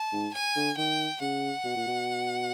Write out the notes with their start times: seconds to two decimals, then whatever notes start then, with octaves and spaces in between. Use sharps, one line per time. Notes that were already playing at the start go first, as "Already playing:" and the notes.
Already playing: A5
0.13 G#2
0.34 G#5
0.56 D3
0.77 D#3 G5
1.21 C#3 F#5
1.64 B2
1.76 A#2
1.87 B2